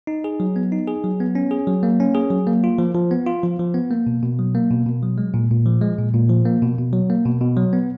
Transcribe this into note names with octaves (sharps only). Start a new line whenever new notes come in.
D#4
G#4
F#3
B3
D#4
G#4
F#3
B3
C#4
G#4
F#3
A#3
C#4
G#4
F#3
A#3
F4
F3
F3
B3
F4
F3
F3
B3
A#3
B2
B2
F#3
A#3
B2
B2
F#3
G#3
A#2
A#2
F3
G#3
A#2
A#2
F3
A#3
B2
B2
F#3
A#3
B2
B2
F#3
B3